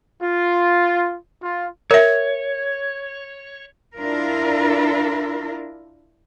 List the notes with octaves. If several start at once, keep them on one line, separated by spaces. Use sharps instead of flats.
F4
F4
A#4 C#5 E5
D4 E4 F4 A#4